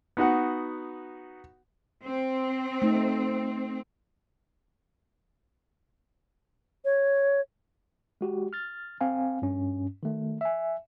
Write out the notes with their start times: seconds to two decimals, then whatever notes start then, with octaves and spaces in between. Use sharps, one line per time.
0.17 B3 D#4 F#4 F#5
2.03 C4
2.82 A3 D#4
6.85 C#5
8.21 G#3 F#4 G4
8.53 F6 A6
9.01 C4 F5 G#5
9.42 G2 C#4
10.03 D#3 A3
10.41 E5 G#5